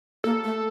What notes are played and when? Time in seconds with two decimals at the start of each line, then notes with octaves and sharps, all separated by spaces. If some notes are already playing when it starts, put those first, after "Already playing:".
0.24 A#3 A4
0.44 A3